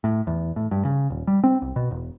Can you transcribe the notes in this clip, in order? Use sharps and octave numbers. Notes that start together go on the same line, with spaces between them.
A2
E2
A2
G2
C#3
D#1
G3
C4
C2
B2
E1